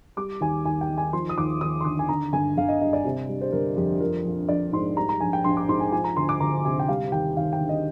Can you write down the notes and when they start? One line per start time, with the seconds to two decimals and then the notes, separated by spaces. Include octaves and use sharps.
0.17 G3 D6
0.41 D#2 G#5
0.65 D#2 G#5
0.81 G5
0.89 D#3
0.98 G#5
1.13 F3 C6
1.29 D#6
1.38 D#2 D6
1.61 D#2 D#6
1.80 C6
1.84 D3 D6
1.99 G#5
2.09 D3 A#5
2.33 G1 G#5
2.58 G1 F5
2.68 D#5
2.81 G2 D#5
2.93 D5
3.05 C3
3.29 G3
3.41 C5
3.52 G1 A#4
3.76 F2 G4
4.00 F3 A#4
4.25 A#1
4.48 A#1 D5
4.73 G#2 C6
4.97 G3 A#5
5.09 A#5
5.20 A#1 G#5
5.33 G5
5.44 A#1 C6
5.57 D6
5.69 G#2 C6
5.80 G#5
5.92 F3 G#5
6.04 A#5
6.16 D2 C6
6.29 D6
6.40 D2 A#5
6.65 C3 G#5
6.79 G5
6.88 G3 F5
7.12 D#2 G5
7.37 D#2 F5
7.53 G5
7.60 D3
7.69 D#5